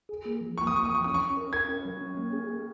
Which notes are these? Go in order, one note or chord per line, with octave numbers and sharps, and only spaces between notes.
G#4
A#3
F3
A#3 C#6
D#6
A#3 C#6
F3 D#6
C#6
C#4 D#6
C#6
C#4
A#4
A#4 G#6
C#4
F#3
C#4
A#3
G#4
G#4